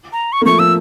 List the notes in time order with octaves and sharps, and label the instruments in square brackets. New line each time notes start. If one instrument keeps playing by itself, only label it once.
[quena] A#5
C#6
[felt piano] A#3
[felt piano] F3 A3 [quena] C#6
[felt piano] F3 [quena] E6